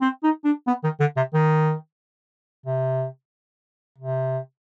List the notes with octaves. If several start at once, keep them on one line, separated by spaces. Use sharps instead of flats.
C4
D#4
D4
B3
D#3
D3
C3
D#3
C3
C3